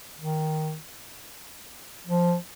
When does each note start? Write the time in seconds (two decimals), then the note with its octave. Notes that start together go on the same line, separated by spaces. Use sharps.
0.19 D#3
2.07 F3